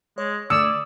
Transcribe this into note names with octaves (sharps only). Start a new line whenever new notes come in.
G#3 C#5
D3 A3 D5 D#6 E6 G#6 C#7